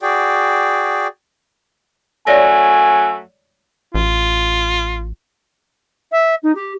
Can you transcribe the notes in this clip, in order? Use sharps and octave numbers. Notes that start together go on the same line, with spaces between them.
F#4 G#4 D5 G5
F#2 F#3 A3 C#5 D5 G#5 A#6
A1 F4
E5
D#4
G4